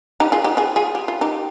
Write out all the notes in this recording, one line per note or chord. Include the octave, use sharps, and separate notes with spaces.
D#4 G4
F4 G#4
D#4 G4
F4 G#4
F4 G#4
G4
F4
D#4 G4